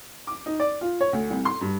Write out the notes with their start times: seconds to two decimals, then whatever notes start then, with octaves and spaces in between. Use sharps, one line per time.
0.27 D6
0.46 D#4
0.60 D5
0.81 F4
1.01 C#5
1.13 D2
1.31 C2
1.45 C6
1.61 G2